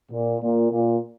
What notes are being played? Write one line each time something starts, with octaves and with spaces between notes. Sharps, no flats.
A#2
A#2
A#2